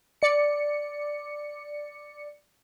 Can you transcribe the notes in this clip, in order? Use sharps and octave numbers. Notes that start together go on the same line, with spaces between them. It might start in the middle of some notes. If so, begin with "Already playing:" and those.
D5 C#7